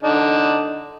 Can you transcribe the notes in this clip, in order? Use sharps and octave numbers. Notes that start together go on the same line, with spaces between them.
D3 D4 D#4